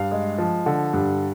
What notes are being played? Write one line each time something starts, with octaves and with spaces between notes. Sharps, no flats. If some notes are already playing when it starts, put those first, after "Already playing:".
Already playing: G2 F5
G#3
F3
D3
G2